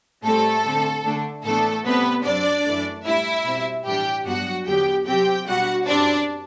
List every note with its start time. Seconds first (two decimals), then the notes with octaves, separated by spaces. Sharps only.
0.23 A2 G3 A3 C4 A4
0.65 D3 A3 C4
1.04 D3 A3 D4
1.44 A2 E3 A3 B3 D4 A4
1.85 C3 G3 B3 C4 B4
2.25 F#2 F#3 C4 D4 D5
2.65 F#2 E3 A3
3.05 A2 G3 D4 E4 E5
3.45 B2 G3 C4
3.85 A2 E3 G3 D4 G4 G5
4.26 G2 F#3 B3 D4 F#4 F#5
4.66 E2 D3 F#3 B3 G4 G5
5.06 C3 F#3 C4 G4 G5
5.47 B2 G3 D4 F#4 F#5
5.87 F#2 E3 G3 C4 D4 D5